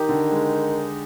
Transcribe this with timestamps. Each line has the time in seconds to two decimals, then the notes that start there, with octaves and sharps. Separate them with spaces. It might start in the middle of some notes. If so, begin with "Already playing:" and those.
Already playing: D#3 D#4 G4
0.09 D3
0.32 G#3